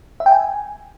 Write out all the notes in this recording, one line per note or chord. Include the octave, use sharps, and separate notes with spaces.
E5
G5
G#5